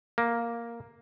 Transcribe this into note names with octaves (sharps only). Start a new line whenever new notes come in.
A#3